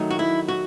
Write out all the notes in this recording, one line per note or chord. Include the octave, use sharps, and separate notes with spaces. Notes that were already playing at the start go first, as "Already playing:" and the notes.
Already playing: D#3 F#3 A3 D#4
F#4
E4
F#4